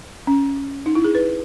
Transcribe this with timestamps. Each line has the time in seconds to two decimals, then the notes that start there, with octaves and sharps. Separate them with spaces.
0.27 C#4
0.86 D#4
0.95 E4
1.04 G#4
1.15 B4